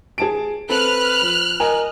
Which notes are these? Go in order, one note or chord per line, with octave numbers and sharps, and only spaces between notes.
G#4 A5 D7
C4 A4 B4 F6 F#6
F3
A#4 D#5 G#5